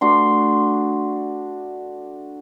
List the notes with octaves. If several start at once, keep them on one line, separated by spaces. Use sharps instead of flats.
A3 D4 F#4 C6